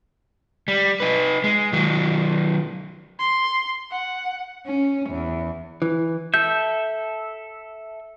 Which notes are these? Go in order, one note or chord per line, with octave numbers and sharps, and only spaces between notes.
G3
D#4 B4
G#3
D#3 F#3
C6
F#5
C#4
E2
E3
A4 E5 G6